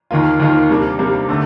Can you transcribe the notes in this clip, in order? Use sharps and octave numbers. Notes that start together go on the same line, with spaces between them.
D#2 D#3 A#3 F4
D#2 D#3 A#3 F4
C3 G3 A#3 D4
C3 G3 A#3 D4
D3 A3 D4